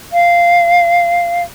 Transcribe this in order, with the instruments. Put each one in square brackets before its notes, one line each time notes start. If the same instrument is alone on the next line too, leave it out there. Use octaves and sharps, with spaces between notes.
[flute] F5